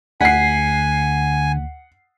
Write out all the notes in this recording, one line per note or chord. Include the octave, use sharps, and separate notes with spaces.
D2 D3 F#5 G#5 B6 C7